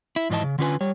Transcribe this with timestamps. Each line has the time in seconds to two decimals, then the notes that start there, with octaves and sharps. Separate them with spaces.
0.16 E4
0.30 F2 G#2 E3 D#5 A5
0.44 C#3
0.58 D3 C#4 F4 B4 G#5
0.81 G3 C#5